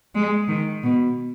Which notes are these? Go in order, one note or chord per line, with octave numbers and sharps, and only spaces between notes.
G#3
D#3
B2